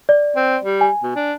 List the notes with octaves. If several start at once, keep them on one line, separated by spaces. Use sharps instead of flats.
D5
C4
G3
G#5
B2
D4